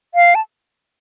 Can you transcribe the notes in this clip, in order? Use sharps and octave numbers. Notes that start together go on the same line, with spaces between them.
F5
A5